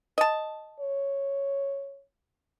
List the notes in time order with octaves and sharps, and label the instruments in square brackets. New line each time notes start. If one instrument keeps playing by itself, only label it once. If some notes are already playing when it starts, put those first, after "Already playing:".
[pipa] D#5 A5
[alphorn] C#5